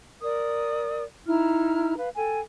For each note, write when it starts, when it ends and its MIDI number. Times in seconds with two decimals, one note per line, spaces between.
0.21 1.03 70
0.21 1.03 74
0.21 1.03 87
1.27 1.94 63
1.27 1.94 64
1.27 1.94 82
1.27 1.94 89
1.96 2.08 71
1.96 2.08 77
2.16 2.40 69
2.16 2.40 79
2.16 2.40 80